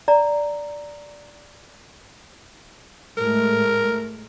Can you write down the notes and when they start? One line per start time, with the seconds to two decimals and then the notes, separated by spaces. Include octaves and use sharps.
0.08 D5 A#5
3.17 A2 G#3 A3 A#4